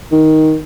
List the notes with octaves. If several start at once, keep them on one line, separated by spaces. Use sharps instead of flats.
D#3